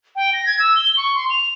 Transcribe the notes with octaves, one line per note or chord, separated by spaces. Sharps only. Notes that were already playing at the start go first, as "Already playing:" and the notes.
G5
A#6
G#6
E6
G7
C#6
C6
F7